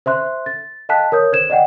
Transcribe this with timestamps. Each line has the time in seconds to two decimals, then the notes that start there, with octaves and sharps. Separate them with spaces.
0.06 C5 E5 C6 F#6
0.46 A6
0.89 D#5 F5 G5 A5 F#6 B6
1.12 A#4 C#5 D#6 G6
1.33 C5 G#6 E7
1.50 D5 D#5 F#5 G5